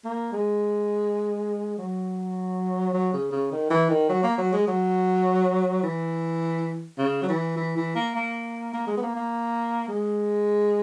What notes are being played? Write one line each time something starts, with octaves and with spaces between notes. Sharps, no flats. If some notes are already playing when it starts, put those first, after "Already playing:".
A#3
G#3
F#3
F#3
C#3
C#3
D#3
E3
D#3
F#3
A#3
F#3
G#3
F#3
E3
C#3
F#3
E3
E3
E3
A#3
A#3
A#3
G#3
B3
A#3
A#3
G#3